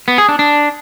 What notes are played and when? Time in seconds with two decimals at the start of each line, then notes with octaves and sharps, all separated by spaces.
0.08 B3
0.18 G#4
0.29 D4
0.39 D4